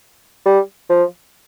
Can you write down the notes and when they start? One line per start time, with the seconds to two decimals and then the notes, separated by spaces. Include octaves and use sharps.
0.46 G3
0.90 F3